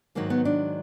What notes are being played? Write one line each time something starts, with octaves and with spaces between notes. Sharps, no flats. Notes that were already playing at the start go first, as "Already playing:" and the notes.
G#2 D#3 F#3 A#3
B3
D4